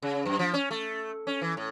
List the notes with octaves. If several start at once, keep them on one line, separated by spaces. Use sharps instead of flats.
C#3
F#2
F3
C#4
A3
C#4
E3
A2